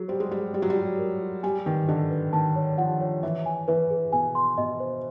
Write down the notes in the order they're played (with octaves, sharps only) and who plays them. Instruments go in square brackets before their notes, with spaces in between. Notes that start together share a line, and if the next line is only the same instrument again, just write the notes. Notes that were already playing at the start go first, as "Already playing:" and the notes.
Already playing: [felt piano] F#3 [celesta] G#4
[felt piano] G3 [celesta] C5
[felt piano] G#3
[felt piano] G3 [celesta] G#4
[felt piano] G3 [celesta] D5
[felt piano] F#3
G3
[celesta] F4
A#4
F4
[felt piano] G3 [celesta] G#5
[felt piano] D#3 [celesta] B4
[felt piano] D3 [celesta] D#5
[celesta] B4
[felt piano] D#3 [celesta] A5
[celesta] C#5
[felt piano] F3 [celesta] F#5
[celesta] C#5
[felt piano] E3 [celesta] E5
[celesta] G#5
[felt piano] E3 [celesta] B4
[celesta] G#4
[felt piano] B2 [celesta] G#5
[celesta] C6
[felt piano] B2 [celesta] D#5
[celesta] C5